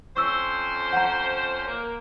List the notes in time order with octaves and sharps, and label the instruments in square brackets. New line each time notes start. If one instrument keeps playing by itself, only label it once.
[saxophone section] F2 C#4 C5 [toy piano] C#6 E6
[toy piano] F#5 A#5
[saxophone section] A#3